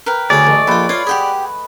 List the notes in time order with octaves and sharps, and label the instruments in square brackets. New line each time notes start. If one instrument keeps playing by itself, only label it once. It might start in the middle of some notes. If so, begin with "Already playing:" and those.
[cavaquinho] A#4 B4 G5
[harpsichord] D2 C#3 C#5 [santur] G#4 [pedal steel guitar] D5
[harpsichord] A1 [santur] A3 D#5
[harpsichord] A#1 F4 [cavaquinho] A4 G5 [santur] B4
[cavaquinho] F4 F5 [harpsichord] C#5
[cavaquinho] G4 G5 B5 [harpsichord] G#4 F#5